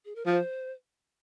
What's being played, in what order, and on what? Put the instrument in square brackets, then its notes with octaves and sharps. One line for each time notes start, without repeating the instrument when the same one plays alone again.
[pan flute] G#4
A#4
[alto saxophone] F3 [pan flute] C5